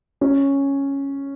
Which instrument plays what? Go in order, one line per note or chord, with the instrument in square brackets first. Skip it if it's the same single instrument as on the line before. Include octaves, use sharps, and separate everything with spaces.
[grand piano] C#4